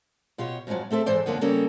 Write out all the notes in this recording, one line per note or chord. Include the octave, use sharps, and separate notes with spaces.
B2 F4 G4 C#5
F2 G#2 C3 F3 F#3
A3 C4 A4 E5
G#2 E3 A4 C5 D5
F#2 D3 F3 A#3 B3
C#3 G3 A#3 C#4 G4 A4